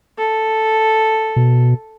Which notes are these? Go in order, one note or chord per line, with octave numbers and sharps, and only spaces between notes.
A4
B2